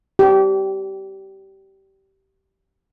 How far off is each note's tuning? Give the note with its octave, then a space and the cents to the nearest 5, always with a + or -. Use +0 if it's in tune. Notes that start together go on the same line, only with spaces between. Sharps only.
G4 -20